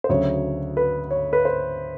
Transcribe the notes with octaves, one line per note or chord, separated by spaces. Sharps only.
C5
D2 C#3 F#3 C#5
B4
C#5
B4
C5